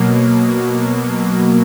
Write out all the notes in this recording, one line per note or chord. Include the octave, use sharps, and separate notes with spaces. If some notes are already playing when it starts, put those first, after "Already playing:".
Already playing: B2 F#3 A#3